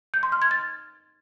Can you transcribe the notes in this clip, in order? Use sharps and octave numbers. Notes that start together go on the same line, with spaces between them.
G6
C6
F6
G#6
A6